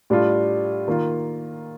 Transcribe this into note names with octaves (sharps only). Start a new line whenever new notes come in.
A2 G3 D4 F4
D#3 A#3 F4